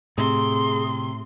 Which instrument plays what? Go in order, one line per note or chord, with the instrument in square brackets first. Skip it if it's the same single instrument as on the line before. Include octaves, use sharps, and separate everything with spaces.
[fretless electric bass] A2 [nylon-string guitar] C3 [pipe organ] G#4 [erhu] C6